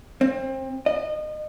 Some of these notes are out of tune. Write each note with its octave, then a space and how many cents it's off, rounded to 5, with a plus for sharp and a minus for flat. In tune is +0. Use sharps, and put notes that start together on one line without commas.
C4 +25
D#5 -30